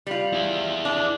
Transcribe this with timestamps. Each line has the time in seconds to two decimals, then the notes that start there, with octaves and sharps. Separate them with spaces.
0.07 G3 F4
0.33 E4 G#4
0.85 D4